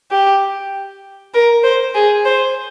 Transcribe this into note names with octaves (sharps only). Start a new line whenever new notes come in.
G4
A#4
C5
G#4
C5